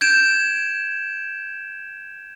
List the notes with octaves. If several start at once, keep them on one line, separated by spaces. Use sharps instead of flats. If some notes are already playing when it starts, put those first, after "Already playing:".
G6 G#6 D7 E7